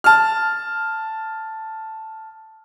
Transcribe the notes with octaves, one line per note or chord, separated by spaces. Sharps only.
A5 F6